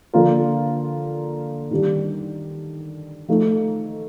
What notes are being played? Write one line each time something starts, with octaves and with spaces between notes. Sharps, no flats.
D3 F3 A#3 F4 A#4
D#3 G3 D4
F3 A3 D#4